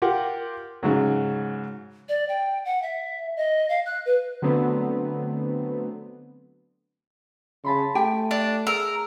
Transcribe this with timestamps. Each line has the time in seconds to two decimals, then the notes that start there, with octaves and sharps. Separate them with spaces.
0.02 F4 G4 A#4 F#5
0.83 G#2 C#3 F#3
2.09 D5
2.29 G5
2.65 F#5
2.83 E5
3.37 D#5
3.69 F5
3.86 F#6
4.06 B4
4.42 D3 F#3 A3 B3 C4
7.65 C#3 A5 B5 C6
7.95 A3 G4 G5 G#5
8.31 D4
8.67 G#4 A#4 E6